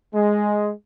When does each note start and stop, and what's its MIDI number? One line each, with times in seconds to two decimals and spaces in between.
0.13 0.70 56